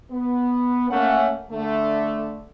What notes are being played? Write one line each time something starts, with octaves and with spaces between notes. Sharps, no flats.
B3
A3 A#3 C#4 F#5
D3 A3